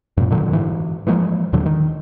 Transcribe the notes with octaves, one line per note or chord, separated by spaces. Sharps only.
F#2 A#2
A#2 D3 D#3 F#3
G#2 E3
E3 F3 G#3 A#3
D#2 A#2 D3 F#3
D#3